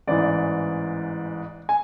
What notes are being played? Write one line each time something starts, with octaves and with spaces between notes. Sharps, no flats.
A1 G#2 E3 D5
G#5